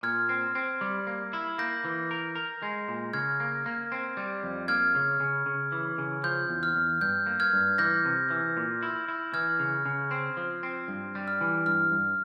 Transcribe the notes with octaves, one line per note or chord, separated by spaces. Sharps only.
A#2 F6 G#6
C4
C4
G3
A#3
E4
A#3 G6 A#6
E3
A#4
A#4
G#3
A#2
C#3 F6 G#6
A#3
A#3
C4
G3
F2
A#3 F6 G#6
C#3
C#3
C#3
E3
C#3
F3 G6
E2
F6
E2
G2 G6
A#3
F6 G#6
G2
E3 G6 A#6
C3
E3
A#2
E4
E4
E3 F6 G#6
C#3
C#3
C4
F3
C4
G2
G3
F6
E3
G2 F6
G2